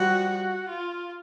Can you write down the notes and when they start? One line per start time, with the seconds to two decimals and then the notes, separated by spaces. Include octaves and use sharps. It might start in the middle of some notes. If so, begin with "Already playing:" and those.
Already playing: F3 G3 F#4
0.30 F#4
0.69 F4